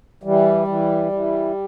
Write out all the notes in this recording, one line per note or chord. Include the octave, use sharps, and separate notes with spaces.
E3 G3
E3
E3